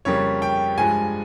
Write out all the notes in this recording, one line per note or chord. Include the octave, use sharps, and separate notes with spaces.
F2 C#3 G3 A#3 C#5
G5
G2 F3 G#3 G#5